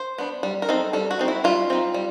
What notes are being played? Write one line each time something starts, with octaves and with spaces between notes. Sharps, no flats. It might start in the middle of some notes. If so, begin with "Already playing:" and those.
Already playing: C5
B3 D4
G3
A#4
C4 D#4 A4
G3 A4
F#4
C4 D#4
E4
G3 F4
C4 D#4
G3